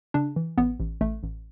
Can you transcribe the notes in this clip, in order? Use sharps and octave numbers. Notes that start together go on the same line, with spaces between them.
C#3 D4
E3
A1 B3
A1
A1 A3
A1